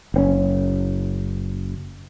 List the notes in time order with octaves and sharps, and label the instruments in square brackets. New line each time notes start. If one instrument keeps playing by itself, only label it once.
[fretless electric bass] F#1 C4 C#4